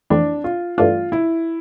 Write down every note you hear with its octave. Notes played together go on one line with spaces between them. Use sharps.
F2 E3 A3 C4 D4 E4
F4
G2 E3 A3 D4 F4
E4